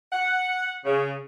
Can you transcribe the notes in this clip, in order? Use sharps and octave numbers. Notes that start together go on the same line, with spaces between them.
F#5
C#3